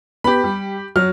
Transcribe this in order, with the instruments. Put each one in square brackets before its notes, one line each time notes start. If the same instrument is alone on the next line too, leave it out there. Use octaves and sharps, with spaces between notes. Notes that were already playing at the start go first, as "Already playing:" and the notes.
[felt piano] B3 [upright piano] G4 B5
[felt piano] G3
[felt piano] F#3 [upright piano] F6